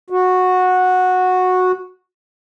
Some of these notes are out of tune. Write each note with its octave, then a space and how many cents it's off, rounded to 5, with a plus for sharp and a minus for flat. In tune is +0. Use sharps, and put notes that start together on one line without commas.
F#4 -10